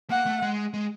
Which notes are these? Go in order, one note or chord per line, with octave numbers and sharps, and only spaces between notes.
A#3 F#5
A3
G#3
G#3